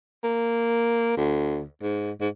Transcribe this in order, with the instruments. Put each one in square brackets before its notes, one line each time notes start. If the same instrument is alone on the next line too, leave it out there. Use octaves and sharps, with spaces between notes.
[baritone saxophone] A#3
D2
G#2
G#2